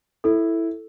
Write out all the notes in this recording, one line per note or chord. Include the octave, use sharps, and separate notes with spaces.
E4 A4